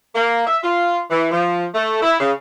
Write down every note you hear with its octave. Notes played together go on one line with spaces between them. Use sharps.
A#3
E5
F4
E3
F3
A3
E4
C#3